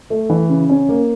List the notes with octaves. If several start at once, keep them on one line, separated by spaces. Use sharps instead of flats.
A3
E3
C#3
C#4
A#3